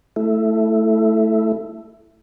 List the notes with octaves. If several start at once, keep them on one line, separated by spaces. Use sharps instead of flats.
A3 E4